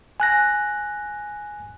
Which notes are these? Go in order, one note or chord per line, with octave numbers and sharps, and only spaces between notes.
G#5 F#6 A#6